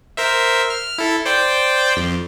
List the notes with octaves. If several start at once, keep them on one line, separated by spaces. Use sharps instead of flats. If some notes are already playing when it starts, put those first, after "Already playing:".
A#4 C5 E5
F6
E4 A4
C5 D5 G5
F2